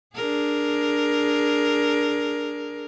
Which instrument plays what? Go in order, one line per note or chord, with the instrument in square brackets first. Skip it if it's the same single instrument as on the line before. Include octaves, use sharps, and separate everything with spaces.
[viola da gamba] D4 G#4 A#4